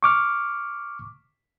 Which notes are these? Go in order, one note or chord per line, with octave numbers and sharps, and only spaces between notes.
C#6 D6 F6